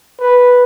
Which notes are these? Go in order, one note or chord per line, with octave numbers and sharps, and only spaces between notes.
B4